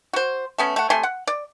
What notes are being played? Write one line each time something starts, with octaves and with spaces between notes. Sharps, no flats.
F#4 C5
A3 B3 C#4
A3 F#5
C3 A3 G#5 C6
F#5
D5